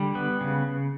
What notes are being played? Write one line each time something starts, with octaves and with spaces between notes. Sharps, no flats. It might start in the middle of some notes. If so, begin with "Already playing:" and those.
Already playing: D3 G3
B3
C#3